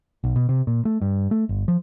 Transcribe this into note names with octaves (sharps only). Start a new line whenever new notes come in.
B1
B2
C3
A#2
A3
G2
A3
G1
F3